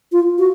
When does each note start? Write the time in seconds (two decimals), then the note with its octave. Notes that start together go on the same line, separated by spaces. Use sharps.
0.12 F4
0.39 F#4